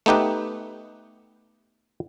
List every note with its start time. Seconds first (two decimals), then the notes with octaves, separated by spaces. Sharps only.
0.06 A3 B3 D#4 G4 B4